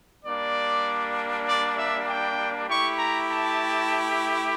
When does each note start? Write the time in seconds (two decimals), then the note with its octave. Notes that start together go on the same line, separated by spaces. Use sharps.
0.25 G3 A#3 D4 D5
1.46 D5
1.77 E5
2.07 G5
2.68 A3 E4 G4 C#6
2.98 A#5
3.28 A5